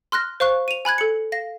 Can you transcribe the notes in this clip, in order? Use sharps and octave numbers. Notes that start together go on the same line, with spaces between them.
C6 F6 F#6 A#6
C5 F5 C#6 F#6
D#7 F7
G#5 B5 F#6 G#6
A4 C#7
F5 A#6